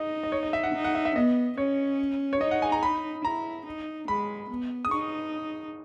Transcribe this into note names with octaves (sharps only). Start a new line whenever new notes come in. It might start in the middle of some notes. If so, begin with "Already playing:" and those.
Already playing: D#4 D#5
D#5
C#5
D#5
E5
F#5
D#4
F#5
E5
E5
B3 D#5
C#4 C#5
C#5
D#4 D#5
F#5
G#5
A#5
B5
E4 A#5
D#4
G#3 B5
B3
D#6
D#4 C#6